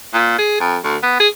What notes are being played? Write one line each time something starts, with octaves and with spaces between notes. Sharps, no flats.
A#2
G#4
F2
D2
B3
G#4